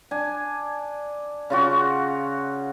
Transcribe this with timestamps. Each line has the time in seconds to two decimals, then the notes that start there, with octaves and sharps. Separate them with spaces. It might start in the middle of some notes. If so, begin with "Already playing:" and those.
0.11 D4 G#5
1.50 C#3 F4 F#4